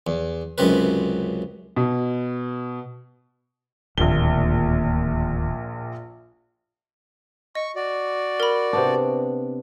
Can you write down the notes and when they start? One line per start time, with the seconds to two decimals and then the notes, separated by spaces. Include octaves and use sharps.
0.07 E2
0.58 C#2 F#2 C3 B4
1.76 B2
3.98 D1 A#1 D#2 A#2 G7
7.55 D#5 C#6
7.76 F#4 D5
8.40 A#4 B5
8.73 C3 B3 D4